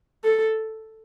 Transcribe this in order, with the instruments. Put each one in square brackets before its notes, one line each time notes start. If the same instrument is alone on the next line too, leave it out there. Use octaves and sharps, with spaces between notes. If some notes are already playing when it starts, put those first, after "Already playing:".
[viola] A4